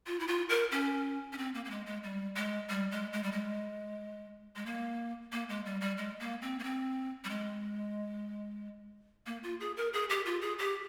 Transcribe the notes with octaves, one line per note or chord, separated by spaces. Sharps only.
F4
E4
F4
A#4
C#4
C#4
C4
A#3
A#3
G#3
G#3
G3
G#3
G3
G#3
G#3
G3
G#3
G#3
A#3
A#3
G#3
G3
G3
G#3
A#3
C4
A#3
C4
G3
G#3
A#3
F4
G#4
A#4
G#4
G4
F4
G#4
G4